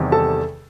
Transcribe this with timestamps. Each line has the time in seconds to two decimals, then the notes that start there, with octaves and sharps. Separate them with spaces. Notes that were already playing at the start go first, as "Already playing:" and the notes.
Already playing: E2 C3 D#3 G3
0.12 A4 A5